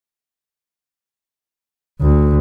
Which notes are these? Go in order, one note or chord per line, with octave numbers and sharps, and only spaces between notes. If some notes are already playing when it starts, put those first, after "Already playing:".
D2